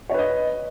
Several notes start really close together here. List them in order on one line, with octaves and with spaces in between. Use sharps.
C#5 B4 D#5